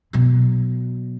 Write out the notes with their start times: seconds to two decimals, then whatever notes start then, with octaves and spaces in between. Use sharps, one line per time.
0.13 B2 F#3